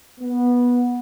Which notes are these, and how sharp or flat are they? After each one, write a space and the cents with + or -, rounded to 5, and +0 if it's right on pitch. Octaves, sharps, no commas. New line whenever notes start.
B3 -15